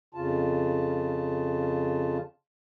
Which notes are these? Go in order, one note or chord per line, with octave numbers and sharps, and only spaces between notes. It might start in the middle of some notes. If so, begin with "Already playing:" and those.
F2 C#3 F4 A5